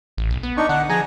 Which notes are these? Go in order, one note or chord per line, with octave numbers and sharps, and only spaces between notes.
A1
B1
B3
D4 D#4 C#6
D3 F#5
F3 G#4 G#5 A#5